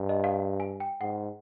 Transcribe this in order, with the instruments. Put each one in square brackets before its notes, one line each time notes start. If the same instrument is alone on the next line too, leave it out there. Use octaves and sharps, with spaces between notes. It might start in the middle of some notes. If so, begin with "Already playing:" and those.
Already playing: [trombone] G2
[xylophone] D#5
F5
G#5
G5
[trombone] G#2 [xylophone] F#5